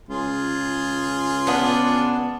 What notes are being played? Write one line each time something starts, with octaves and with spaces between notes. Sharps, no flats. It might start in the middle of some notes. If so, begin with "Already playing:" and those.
C#2 F4 G#4
B3 D4